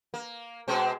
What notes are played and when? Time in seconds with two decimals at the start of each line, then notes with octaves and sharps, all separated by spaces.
0.14 A#3
0.68 B2 G#3 C4